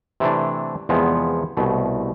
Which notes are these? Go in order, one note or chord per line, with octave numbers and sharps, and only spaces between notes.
C3 E3 A3 D4
E2 C3 F3 G#3 B3
C2 B2 A3